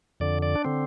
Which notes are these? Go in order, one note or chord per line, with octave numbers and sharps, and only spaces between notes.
F2 D3 D5
D5
D4
D3 C4